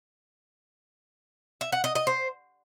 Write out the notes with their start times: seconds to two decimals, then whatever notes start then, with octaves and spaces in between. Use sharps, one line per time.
1.61 E5
1.72 F#5
1.84 D#5
1.95 D#5
2.07 C5